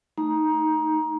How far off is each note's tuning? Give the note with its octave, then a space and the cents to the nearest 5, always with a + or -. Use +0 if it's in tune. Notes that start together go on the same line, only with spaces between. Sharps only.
A3 +10 D#4 +0 A#5 +20